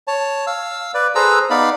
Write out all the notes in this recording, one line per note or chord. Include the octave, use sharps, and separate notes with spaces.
C#5 A5
F5 E6
B4 D5
G#4 A4 B4 C5 A#5 E6
B3 D#4 D5 F5 B5